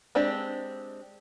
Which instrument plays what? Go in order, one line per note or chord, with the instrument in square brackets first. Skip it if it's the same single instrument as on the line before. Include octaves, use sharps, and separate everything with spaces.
[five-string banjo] G#3 C4 D4 G4